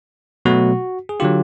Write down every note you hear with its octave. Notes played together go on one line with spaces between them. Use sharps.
B2 F#3 A3 F#4
G#4
D3 F#3 F4 G4